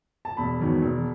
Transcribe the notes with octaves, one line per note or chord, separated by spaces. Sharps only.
A5
E1 B5
E2 D#3 F#3
E1